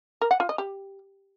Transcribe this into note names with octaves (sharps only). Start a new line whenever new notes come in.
A#4
F#5
F4
D#5
G4